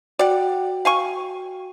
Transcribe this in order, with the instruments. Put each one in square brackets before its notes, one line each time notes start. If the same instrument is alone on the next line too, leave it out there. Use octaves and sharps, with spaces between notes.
[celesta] F#4 G5 [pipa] D5 F#5
[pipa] F5 G#5 C#6